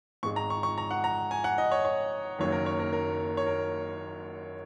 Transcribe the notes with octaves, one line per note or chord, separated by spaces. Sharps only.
G#1 G#2 G#3 C#6
A#5
C#6
C#6
A#5
F#5
A#5
G#5
F#5
D#5
C#5
C#5
F#1 F#2 D#3 F#3 A#3 C#5
A#4
C#5
A#4
A#4
C#5
A#4